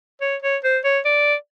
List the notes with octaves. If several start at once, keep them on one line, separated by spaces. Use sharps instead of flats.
C#5
C#5
C5
C#5
D5